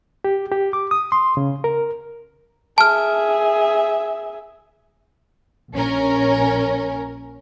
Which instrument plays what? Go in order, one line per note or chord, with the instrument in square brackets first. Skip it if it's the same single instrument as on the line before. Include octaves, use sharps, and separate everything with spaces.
[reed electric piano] G4
G4
D6
D#6
C6
C#3
A#4
[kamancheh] G#4 E5 [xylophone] A5 F6
[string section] A#1 C#4 A#4